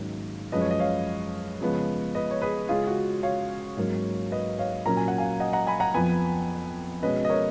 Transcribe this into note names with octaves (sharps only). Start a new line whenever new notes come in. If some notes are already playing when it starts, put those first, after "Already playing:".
Already playing: G#2 D#3 F#3 A#3 C#4
F#2 F3 G#3 C#4 B4 D#5
C#5
D#5
C#5 F5
C#3 F3 G#3 B3
B4 D#5
C#5
G#4 B4
C#3 G#3 C#4 F4 G#4
F#4
C#5 F5
G#2 F#3 A#3 C#4
B4 D#5
C#5 F5
A#2 F#3 A#3 C#4 A#5
G#5
F#5
F5 G#5
D#5 F#5
F#5 A#5
G#5 B5
F#5 A#5
F2 F3 B3 G#5 B5
B2 G#3 C#4 B4 D#5
D#5
A#4 C#5